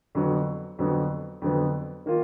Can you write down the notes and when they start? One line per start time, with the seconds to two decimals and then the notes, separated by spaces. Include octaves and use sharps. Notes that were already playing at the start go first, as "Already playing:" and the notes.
0.15 F2 D3 F#3 B3
0.79 F2 D3 F#3 B3
1.42 F2 D3 F#3 B3
2.06 D#3 A#3 F4